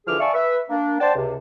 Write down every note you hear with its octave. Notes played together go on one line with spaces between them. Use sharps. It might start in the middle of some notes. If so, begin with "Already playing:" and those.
D3 E3 F3 G#4 D6 F6
D5 E5 F5 G#5 A5 C#6
B4 E5
A#3 D4
C5 D5 F#5 G5 A5
C#2 C3